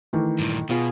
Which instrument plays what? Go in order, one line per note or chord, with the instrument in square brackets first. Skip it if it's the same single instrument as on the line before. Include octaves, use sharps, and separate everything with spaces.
[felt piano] D#3 E3 A3
[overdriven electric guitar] G2 A#2
[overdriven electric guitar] B2 [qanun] B3 F4 G#4